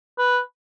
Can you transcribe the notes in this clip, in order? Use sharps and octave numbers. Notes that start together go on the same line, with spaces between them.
B4